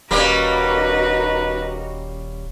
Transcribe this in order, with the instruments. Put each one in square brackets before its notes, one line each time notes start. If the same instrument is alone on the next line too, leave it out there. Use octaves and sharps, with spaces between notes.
[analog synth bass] D#1 [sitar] G3 A#3 C#4 [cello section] D#4 F#4 A#4 [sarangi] B4